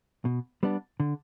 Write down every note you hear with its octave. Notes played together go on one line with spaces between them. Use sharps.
B2
G3 B3 D4
D3